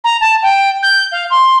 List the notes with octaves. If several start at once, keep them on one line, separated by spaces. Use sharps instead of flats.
A#5
A5
G5
G6
F5
C6